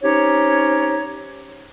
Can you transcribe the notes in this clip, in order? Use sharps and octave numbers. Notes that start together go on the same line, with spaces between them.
C4 C#4 D#4 G4 C#5